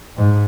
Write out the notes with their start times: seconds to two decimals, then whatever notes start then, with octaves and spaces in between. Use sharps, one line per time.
0.17 G#2